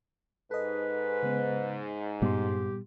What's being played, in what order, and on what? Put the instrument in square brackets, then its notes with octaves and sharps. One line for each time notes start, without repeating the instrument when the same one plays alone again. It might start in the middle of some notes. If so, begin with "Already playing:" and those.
[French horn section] G#2 [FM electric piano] A4 D#5 [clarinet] B4
[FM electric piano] C#3 G#3 B3
[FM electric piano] G2 C6 [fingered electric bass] A#2 G3 B3 [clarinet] G4